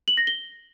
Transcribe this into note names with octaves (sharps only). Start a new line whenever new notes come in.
F#7
A#6
G7